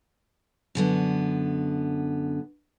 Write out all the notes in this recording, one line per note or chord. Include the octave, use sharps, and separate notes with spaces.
F#2 D3 B3